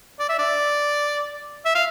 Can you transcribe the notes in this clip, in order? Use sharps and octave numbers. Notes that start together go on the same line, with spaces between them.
D5
E5
D5
E5
F5